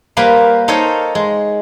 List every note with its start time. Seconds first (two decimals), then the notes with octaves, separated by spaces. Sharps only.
0.17 G3 A#3 B4 C5 F5
0.68 D#4 A4 C5 C#5 D#5 F5
1.15 G#3